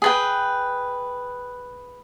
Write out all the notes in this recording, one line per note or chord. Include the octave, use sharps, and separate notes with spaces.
G#4 B4 G5